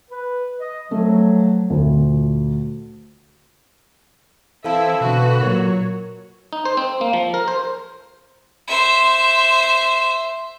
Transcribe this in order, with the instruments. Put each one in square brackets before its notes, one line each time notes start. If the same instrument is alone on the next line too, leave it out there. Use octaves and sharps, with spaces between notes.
[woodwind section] B4
D#5
[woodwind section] F3 F#3 [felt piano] A3
[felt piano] D2 [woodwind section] A#2
[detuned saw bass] E3 [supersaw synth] C4 E5 [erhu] E4 [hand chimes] A4 F5 A5
[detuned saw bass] B2 [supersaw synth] D3 B4 [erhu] F#4
[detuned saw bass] A#2 [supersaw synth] F#3 C#5 [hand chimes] A#4
[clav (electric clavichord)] D#4
C5
C4
A#3
F3
A#4
C5
[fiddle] C5 E5